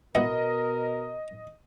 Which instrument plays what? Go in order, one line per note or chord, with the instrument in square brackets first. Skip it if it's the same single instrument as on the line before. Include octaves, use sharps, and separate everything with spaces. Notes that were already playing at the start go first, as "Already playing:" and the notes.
[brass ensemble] B2 A#4 [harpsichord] B3 E4 F#4 [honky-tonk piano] D#5